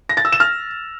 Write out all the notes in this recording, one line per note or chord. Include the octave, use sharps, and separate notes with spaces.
A#6
A6
E6
E7
F6